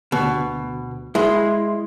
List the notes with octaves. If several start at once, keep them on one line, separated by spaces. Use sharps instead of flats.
D2 B2
G#3 E4 C6